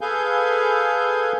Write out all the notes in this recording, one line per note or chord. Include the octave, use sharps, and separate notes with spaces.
G#4 A4 B4 F5 G#5 G6